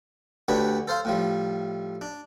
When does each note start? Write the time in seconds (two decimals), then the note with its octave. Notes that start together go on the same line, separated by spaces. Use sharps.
0.48 D2 D3 D4 G4 B4 C#5
0.87 A4 C5 F5 C6
1.05 A2 F3 G3
2.01 D4